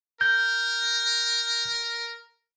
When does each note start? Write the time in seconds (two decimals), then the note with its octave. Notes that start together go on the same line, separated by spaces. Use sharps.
0.21 A#4 G6